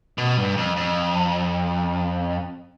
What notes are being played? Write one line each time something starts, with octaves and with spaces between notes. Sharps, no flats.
B2
G2
F2
F2